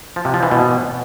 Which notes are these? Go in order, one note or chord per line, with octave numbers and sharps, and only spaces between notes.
F3
C3
F3
E3
B2